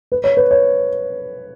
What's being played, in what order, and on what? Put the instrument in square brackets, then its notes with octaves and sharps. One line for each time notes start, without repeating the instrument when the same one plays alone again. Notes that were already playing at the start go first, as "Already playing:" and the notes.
[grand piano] B4
C#5
B4
C#5